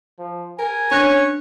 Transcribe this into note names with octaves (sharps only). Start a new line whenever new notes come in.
F3
A#4 G#5
C#4 D4 C#5 F#6 A#6